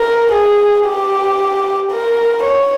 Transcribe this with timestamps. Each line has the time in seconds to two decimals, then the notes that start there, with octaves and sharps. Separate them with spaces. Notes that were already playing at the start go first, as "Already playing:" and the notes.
Already playing: A#4
0.32 G#4
0.86 G4
1.91 A#4
2.44 C#5